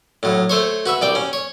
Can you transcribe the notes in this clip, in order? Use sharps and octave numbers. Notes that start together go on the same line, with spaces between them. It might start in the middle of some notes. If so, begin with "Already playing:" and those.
A2 F#3
A3 C5 C#5
F#4 B4 E5
C2 D5 G5
C#4
C#5